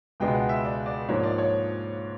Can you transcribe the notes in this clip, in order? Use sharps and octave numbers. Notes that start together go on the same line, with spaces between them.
C#2 B2 G#3 B3 D4 G5
F#5
E5
D5
D5
G#2 F3 A#3 D4 C#5
D5
C#5